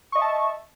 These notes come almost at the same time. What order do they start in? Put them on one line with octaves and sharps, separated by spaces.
C#6 D#5 E5 A5